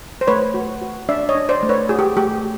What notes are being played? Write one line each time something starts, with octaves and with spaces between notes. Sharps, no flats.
C5
A3 B4 C#5
F#4
F#4
D4 D5 E5
C#5 D#5
D4
C5 D5
A3
B4 C#5
F#4 G#4
G4
A3 G4